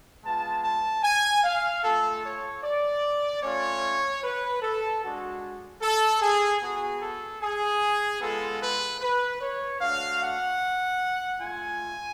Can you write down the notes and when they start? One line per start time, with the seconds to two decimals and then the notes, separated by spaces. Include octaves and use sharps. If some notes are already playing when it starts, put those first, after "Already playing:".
0.24 G#3 B3 F4 A5
0.64 A5
1.03 G#5
1.44 F5
1.83 A3 F4 A4
2.23 C#5
2.63 D5
3.42 A3 C#4 F4 C#5
4.23 B4
4.62 A4
5.03 G#3 D4 F#4
5.82 A4
6.22 G#4
6.61 B3 F#4 G#4
7.01 A4
7.42 G#4
8.21 G#3 B3 F4 A4
8.61 B4
9.01 B4
9.40 C#5
9.80 A3 D4 F#4 F5
10.21 F#5
11.40 A3 F4 G#5